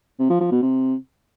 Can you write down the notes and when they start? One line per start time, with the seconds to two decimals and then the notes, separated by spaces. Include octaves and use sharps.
0.19 C3
0.30 F3
0.41 F3
0.51 B2
0.62 C3